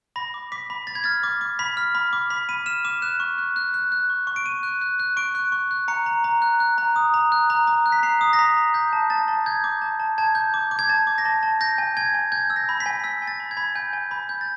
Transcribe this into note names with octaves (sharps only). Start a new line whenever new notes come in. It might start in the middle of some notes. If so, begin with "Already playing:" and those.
B5 A#6
D6
D6 B6
B5
B5 A6
G#6
F6 A6
D6
D6
B5 B6
F6
B5
D6
B5 B6
B5 D#7
F6 E7
D6 E7
F#6 E7
C#6
F#6
F#6
F#6
F#6
C#6
C#6
D7
C#6 D#7
F#6
F#6
F#6
C#6 D7
F#6
C#6
F#6
A#5 C#7
A#5
A#5
F#6
F#6
A#5
D#6
A#5
F#6
A#5
A#5
F#6
B6
A#5 C7
D#6
A#6
A#5 B6
A#5
G6 A#6
A5
A5 A6
A5
G6 G#6
D6
A5
A5
A5 G#6
G6
D6
D6
G#6
A5 A6
D6
A#6
A5 A6
A5
G6 A#6
G#5
G#5 G#6
G#5
G6 G#6
E6
A#6
B5
B6
G#5
E6 B6
G#5
A6
B5
G#6
B5
G#5 G6
G#5
B5
G6
A6